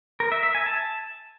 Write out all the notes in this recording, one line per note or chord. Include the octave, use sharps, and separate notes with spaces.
A#4
E5
E5
G#5
A5